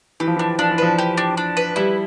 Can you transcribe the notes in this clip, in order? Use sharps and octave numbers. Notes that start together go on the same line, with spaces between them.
E3 G4
F3
E3 D4
F3 D4
E3
F3 B4
G4
D4
D4
B4
G3 E4